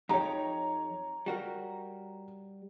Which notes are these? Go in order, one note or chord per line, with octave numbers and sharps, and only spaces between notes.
F2 D#4 G4 C#5 A#5
G3 F#4 A#4